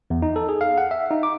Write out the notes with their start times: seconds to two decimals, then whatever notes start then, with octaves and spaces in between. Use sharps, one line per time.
0.10 E2
0.22 D#4
0.36 A4
0.49 G#4
0.61 F5
0.78 F#5
0.91 E5
1.11 D#4
1.23 D6